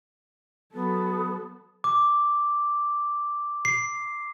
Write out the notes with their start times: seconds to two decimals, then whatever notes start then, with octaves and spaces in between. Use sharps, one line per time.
0.74 F#3 B3 A4
1.84 D6
3.65 C7